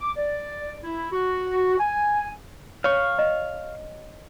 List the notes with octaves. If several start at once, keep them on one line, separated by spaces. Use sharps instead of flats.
D6
D5
E4
F#4
G#5
C#5 F5 C#6
D#5